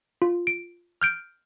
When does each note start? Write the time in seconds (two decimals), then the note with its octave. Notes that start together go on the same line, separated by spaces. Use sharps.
0.22 F4
0.47 D7
1.02 F6 G6 D7